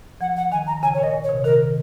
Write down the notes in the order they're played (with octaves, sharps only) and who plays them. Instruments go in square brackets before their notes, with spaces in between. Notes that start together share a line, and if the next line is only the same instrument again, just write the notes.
[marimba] F3 [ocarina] F#5
[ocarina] F#5
[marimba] D#3 [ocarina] G#5
[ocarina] A#5
[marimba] C#3 [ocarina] G#5
[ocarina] C#5
[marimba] A#2 [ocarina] D#5
[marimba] A#2
[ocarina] C#5
[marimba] C3
[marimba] D#3 [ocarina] A#4